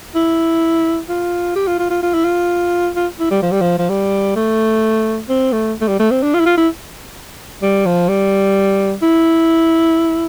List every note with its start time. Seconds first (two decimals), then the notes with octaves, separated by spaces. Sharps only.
0.15 E4
1.09 F4
1.56 G4
1.67 F4
1.79 F4
1.90 F4
2.03 F4
2.14 E4
2.25 F4
2.96 F4
3.20 E4
3.31 G3
3.42 F3
3.52 G3
3.61 F3
3.79 F3
3.89 G3
4.36 A3
5.29 C4
5.52 A3
5.81 A3
5.88 G3
6.00 A3
6.11 C4
6.22 D4
6.34 F4
6.40 E4
6.46 F4
6.57 E4
7.62 G3
7.86 F3
8.09 G3
9.02 E4